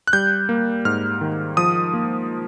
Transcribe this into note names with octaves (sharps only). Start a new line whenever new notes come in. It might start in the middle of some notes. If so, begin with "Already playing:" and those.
F#6
G3 G6
A#3
G#2 F6
D#3
F3 D#6
A#3